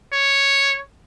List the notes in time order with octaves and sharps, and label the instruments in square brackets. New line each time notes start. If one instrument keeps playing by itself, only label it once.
[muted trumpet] C#5